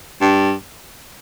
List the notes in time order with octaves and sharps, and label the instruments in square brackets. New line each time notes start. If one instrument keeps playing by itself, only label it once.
[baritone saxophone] G2